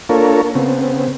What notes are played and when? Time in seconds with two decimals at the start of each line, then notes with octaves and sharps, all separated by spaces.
0.09 A#3 D4 F4 A4 A#4 C#5
0.55 C#3 B3 C4